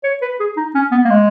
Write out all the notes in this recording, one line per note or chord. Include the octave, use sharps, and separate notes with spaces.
C#5
B4
G#4
D#4
C#4
B3
A#3
G#3